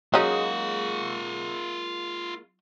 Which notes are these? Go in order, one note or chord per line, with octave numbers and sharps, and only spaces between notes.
F#3 G#3 A#3 C#4 D#4 F4 F#5